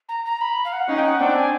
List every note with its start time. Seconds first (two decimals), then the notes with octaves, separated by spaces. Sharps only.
0.09 A#5
0.25 A#5
0.41 B5
0.65 F5
0.73 F#5
0.88 C#4 D#4 F5
0.96 G5
1.04 F#5
1.20 C4 D4 G5
1.36 G#5